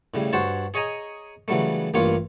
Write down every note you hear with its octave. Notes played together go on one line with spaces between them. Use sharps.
A2 C#3 G3
G2 F#4 C5 C#5 A5
G#4 C#5 D#5 G#5 A#5
C#3 E3 F#3 G3 A3
A1 G2 A#3 F4 C#5